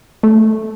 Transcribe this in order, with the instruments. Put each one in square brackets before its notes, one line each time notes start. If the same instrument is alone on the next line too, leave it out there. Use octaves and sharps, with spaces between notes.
[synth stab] A3